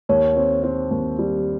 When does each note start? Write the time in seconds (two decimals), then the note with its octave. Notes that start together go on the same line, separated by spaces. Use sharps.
0.09 D#2 C#5
0.36 C4
0.63 C4
0.91 D#2
1.19 G3